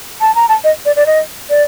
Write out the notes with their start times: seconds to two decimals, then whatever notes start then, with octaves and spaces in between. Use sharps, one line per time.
0.21 A5
0.35 A#5
0.49 A5
0.64 D#5
0.85 D5
0.96 D5
1.06 D#5
1.50 D5